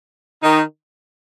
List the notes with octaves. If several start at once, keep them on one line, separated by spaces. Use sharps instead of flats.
D#3 D#4